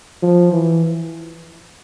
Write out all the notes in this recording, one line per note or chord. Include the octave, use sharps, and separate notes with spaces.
F3
E3